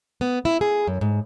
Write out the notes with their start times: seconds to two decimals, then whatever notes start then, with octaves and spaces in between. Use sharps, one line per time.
0.21 B3
0.45 E4
0.61 G#4
0.87 F#2
1.01 G#2